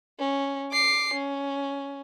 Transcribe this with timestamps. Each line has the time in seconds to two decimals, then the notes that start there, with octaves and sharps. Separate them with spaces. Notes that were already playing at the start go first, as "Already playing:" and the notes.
0.19 C#4
0.72 D6 C7
1.14 C#4